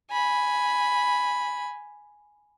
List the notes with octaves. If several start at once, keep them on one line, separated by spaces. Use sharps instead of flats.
G#5 B5